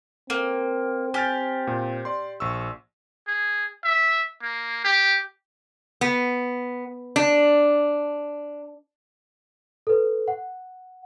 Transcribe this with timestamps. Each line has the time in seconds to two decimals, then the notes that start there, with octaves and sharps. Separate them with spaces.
0.30 A#3 C4
1.14 G4 G#5 F6 A6
1.67 A#2
2.05 D5 C6
2.40 A#1 C#6 E6
3.27 G#4
3.84 E5
4.42 A#3
4.84 G4
6.01 B3
7.16 D4
9.87 A4 B4
10.28 F#5